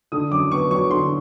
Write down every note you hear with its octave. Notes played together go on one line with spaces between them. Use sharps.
D3 D#6
F#2 D6
B3 C#6
F#3 C#6
D3 C6